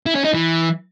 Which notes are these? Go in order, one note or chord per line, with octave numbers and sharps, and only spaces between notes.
E4
C#4
D#4
E3